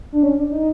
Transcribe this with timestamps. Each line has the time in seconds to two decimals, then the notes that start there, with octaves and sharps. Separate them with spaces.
0.12 D4
0.23 C#4
0.38 D4
0.51 D#4